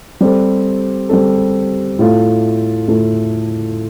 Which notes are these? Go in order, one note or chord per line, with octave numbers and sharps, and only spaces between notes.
G3 C4 A4
G3 C4 A4
A2 A3 F4 A4
A2 A3 F4 A4